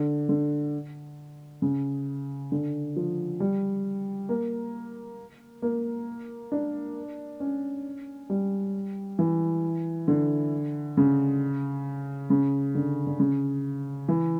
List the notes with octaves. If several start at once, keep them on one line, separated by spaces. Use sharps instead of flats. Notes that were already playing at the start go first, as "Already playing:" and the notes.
Already playing: D3
D3
C#3
D3
F3
G3
A#3
A#3
D4
C#4
G3
E3
D3
C#3
C#3
D3
D3
C#3
E3